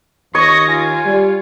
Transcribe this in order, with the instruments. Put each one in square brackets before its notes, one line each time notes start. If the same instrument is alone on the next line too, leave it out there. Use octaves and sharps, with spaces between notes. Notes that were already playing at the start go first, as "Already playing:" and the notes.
[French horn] D#2 [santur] C#5 [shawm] D#5 [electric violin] C#6 A#6
[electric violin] F4 [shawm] G#5
[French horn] G3